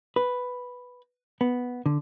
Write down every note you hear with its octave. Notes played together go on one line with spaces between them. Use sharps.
B4
B3
D3